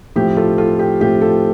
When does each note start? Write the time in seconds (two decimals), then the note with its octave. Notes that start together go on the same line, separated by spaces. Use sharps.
0.16 A2 F3 C4 G4
0.37 F4 A4
0.58 F4 A4
0.79 G4
1.01 A2 F3 C4 G4
1.21 F4 A4